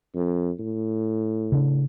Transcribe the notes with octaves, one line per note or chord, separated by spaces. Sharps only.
F2
A2
C#3 D4